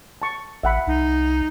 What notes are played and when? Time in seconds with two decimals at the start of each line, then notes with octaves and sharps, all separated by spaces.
0.22 A5 C#6
0.63 A1 E5 F#5 B5
0.87 C2 D#4